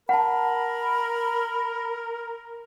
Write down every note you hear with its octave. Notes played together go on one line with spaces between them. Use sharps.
A#4 F#5 A5 B5